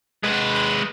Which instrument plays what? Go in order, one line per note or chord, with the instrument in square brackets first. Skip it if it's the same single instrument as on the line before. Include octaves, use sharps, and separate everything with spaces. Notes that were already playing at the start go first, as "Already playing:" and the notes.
[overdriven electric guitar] G#3 B4